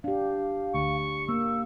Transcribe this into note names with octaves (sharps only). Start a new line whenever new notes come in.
D4 G4 F5
D2 C#6
A#3 E6